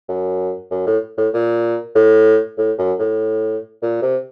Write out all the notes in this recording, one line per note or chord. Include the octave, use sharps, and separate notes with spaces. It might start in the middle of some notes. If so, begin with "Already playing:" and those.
F#2
F#2
A2
A2
A#2
A2
A2
F#2
A2
A#2
C3